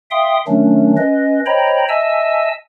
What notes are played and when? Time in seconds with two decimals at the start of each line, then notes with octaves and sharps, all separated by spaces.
0.11 E5 F5 G5 C6 D#6
0.48 D#3 F#3 A3 C#4 D4
0.97 C#4 B4 D#5
1.46 C5 C#5 D#5 G5 A#5 B5
1.89 D#5 E5 G#5 A5 E6